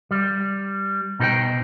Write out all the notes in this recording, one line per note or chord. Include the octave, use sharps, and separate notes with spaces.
G3
B2 D#4 F4 A4 C5 G5